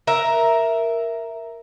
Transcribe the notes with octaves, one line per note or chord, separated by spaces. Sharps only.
A#4 E5